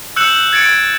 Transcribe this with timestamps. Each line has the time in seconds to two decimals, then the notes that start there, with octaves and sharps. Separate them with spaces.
0.16 E6 F#6 G6 C#7 E7 F#7
0.53 G#6 A6 C#7 D7